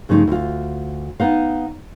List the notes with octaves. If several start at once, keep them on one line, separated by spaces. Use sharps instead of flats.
G2 C#3 F3 A3 D#4
D2 F4
B3 D#4 F5